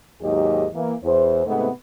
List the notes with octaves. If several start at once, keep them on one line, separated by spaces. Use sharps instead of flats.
D#2 G#2 F#3 G#3 G4 D#5
E3 A#3
E2 C5
G#2 C3 A3 B3